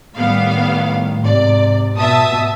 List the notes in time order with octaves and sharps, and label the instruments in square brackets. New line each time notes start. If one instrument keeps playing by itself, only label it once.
[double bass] A2 D#3 [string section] G3 B3 F5
[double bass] G#2 C3 [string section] D5
[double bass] B2 [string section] E5 A5 D#6